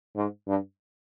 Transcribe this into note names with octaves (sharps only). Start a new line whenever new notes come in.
G#2
G2